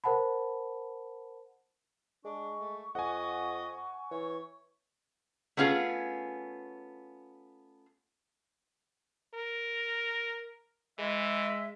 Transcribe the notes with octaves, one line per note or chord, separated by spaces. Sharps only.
A#4 C5 F#5 A5 B5
G#3 D4 C#6
A3
F2 D#5 F#5 G#5
E3 C#5
A3 B3 C#4 F4 G#4
A#4
E3 G#3 E5